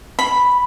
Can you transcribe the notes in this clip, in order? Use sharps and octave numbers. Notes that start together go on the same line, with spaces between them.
B5